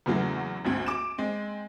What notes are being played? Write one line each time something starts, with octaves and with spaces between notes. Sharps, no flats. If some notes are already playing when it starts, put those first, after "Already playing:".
E2 C#3 E3 F#3 A3
G#1 D2 C4
D6 D7 E7
G#3 C4